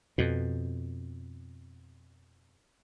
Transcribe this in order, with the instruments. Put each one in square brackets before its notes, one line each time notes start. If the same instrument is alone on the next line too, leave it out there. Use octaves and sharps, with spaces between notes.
[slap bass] F2 B2